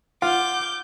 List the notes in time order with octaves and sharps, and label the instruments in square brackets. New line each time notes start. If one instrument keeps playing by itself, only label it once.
[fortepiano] F4 [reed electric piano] F#5 [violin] D6 G6